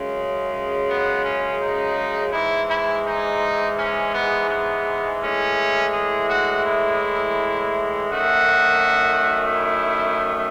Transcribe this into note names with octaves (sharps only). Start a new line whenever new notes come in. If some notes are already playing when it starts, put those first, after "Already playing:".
Already playing: F#2 C#3 G#3
B3
C#4
D#4
G#2 E3 G#3 E4
E4
D#4
C#4
B3
B3
A2 E3 G#3 C#4
G#4
F#4
E4
F#2 D#3 A3 F#4
E4